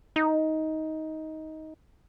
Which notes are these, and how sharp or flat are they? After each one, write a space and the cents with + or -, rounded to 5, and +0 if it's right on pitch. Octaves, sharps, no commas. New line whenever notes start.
D#4 +15